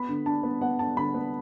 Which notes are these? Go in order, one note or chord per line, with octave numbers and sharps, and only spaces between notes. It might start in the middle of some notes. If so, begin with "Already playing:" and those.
Already playing: B3 B5
D3
D4 A5
B3
B3 F#5
D4 A5
D3 B5
B3